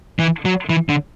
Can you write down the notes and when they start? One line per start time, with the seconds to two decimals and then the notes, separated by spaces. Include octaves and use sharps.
0.19 E3
0.45 F#3
0.70 E3
0.89 D3